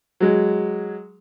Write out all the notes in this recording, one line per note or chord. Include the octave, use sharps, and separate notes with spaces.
F#3 G#3